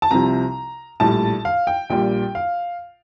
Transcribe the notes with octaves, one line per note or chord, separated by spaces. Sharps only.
A5
C2 C3 F3 A#5
A#1 A2 G3 A5
F5
G5
A#1 A#2 G3 G5
F5